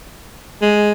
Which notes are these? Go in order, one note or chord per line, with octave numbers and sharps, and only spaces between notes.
G#3